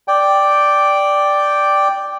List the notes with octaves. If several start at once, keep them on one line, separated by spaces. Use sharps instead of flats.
D5 G5